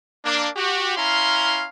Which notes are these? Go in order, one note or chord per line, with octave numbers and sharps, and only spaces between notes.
A#3 D4
F#4 G4
C#4 E4 F5 A#5 C6